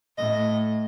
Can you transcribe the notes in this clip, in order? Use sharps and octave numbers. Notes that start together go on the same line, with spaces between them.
A2 D#5